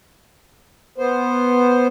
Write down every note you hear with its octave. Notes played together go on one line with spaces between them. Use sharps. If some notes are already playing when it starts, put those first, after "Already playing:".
B3 C5